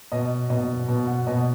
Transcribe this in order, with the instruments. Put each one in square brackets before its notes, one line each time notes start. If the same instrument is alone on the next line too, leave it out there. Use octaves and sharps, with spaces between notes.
[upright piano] B2 D#5
B2 D#5
B2
F#5
B2 D#5